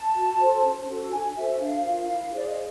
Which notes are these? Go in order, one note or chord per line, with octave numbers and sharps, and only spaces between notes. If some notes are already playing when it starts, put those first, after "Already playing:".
Already playing: A5
F#4
A4 C5
C#4
F#4 A4
D4 G#5
F#4 A4 C5 E5
D4 F5
F4 A#4
E4
G#4 C5 D5
D#5